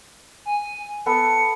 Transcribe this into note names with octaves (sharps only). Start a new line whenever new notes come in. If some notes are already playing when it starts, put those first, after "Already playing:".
G#5
B3 A4 B5 C#7